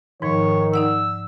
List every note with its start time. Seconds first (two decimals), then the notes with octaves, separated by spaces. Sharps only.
0.22 G#2 D#3 F3 C#5
0.74 D#4 D5 F#5 E6